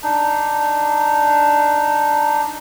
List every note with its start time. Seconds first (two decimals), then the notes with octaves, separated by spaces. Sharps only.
0.03 D4 D#4